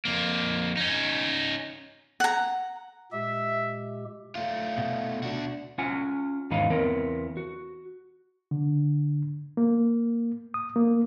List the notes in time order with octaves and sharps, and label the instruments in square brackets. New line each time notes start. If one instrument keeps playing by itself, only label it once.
[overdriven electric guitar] F2 A#3
C#4 D#4
[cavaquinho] F#5 A#5
[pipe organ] A#2 G#3 G4 [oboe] E5
[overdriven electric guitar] A3 F4
[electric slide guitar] B2
[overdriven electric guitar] D4 F#4
[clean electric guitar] C#4 F4 F#5 G#5
E2 G#2 D#3 D#4 B4 F5
E2 B3 C4 A#4
F#4
[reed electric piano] D3
A#3
D#6
A#3